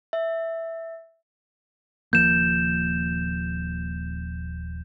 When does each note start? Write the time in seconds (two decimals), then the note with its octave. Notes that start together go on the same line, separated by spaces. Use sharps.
0.13 E5
2.13 D#1 F3 A#3 G6 E7